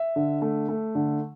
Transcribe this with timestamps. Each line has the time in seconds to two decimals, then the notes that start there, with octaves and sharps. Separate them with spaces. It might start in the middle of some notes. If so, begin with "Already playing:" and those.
Already playing: E5
0.16 D3
0.42 A3
0.69 A3
0.95 D3